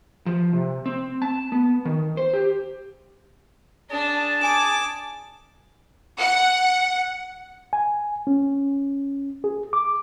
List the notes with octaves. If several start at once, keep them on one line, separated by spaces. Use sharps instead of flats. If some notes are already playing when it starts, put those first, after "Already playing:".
F3
C3
C4
A5
B3
D#3
C5
G4
D4 G#4 A5
G#5 D6
F#5
G#5
C#4
G#4
D6